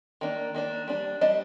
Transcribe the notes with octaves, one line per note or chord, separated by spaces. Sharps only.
D#3 A#3 D4
D#3 A#3 D4
G3 D4
G3 D4 D#5